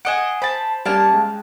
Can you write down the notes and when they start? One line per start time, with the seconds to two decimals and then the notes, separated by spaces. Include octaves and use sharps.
0.05 G#4 D#5 F#5 D7 E7
0.42 C5 A5 B5
0.85 G3 A#3 C#4 F5 A5
1.14 G#3 G5